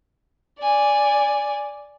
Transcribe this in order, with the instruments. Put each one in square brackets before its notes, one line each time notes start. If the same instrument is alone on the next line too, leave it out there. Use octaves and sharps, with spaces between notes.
[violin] D5 G#5